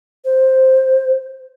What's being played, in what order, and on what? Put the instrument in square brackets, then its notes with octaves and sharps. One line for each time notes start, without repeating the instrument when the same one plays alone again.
[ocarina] C5